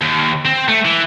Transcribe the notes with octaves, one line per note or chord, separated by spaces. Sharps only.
D#2
C4
A3
E3